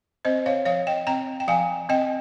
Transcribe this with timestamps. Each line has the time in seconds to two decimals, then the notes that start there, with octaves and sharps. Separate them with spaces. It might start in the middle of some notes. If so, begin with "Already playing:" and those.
0.25 C4 C5 D#5
0.46 C#5 F5
0.66 F3 C#5 F5
0.87 D#5 G5
1.07 C4 G5 A#5
1.40 G5
1.48 F3 F5 G#5
1.89 C4 D#5 G5